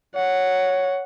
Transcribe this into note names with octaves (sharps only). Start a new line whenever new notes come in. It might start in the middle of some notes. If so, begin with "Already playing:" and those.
C#5 F#5